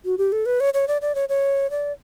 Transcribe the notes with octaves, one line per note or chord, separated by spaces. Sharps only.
F#4
G4
A4
B4
C#5
C#5
D5
D5
C#5
C#5
D5